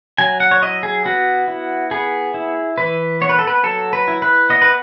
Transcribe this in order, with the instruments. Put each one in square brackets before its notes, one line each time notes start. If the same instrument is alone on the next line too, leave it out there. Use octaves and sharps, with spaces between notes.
[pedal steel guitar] F#3 G#5
F#5
C#5
E4 D#5
G#4
B3 F#4
E4
B3 G#4
E4
E3 B4
B3 C#5
B4
A4
B4
F#3 A4
B4
E4
B4
B3 D#5
B4